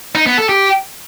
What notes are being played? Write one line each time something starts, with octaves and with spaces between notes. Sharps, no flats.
D#4
B3
A4
G4